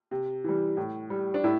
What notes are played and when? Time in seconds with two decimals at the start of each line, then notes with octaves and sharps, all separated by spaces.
0.11 C3
0.44 E3 G3
0.77 A2
1.10 G3
1.34 D4
1.44 A2 E4